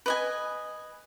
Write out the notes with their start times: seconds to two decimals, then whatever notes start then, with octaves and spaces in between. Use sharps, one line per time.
0.06 B4 D#5 G#5